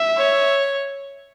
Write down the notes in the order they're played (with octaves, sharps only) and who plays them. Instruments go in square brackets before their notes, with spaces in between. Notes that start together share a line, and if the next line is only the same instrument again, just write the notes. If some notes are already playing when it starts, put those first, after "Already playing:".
Already playing: [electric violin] E5
[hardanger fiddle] C#5